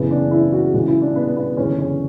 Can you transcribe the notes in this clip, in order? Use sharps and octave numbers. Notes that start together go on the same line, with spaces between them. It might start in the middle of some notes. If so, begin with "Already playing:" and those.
Already playing: F#1 E2 C#3 E3 B3
D4
E4
F#4
C#2 C#3 E3
E4
D4
B3
B3
F#1 E2 D3 C#4
C#4